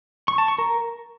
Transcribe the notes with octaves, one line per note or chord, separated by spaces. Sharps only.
C#6
A5
C#6
A#4